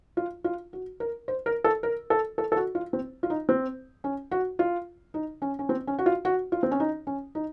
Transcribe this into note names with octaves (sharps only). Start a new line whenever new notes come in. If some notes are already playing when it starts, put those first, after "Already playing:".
F4
F4
F#4
A#4
C5
A#4
A4
A#4
A4
A4
A4
F#4
F4
C4
F4
D#4
C4
C#4
F#4
F4
D#4
C#4
C#4
C4
C#4
F#4
F4
F#4
F4
C4
C#4
D#4
C#4
D#4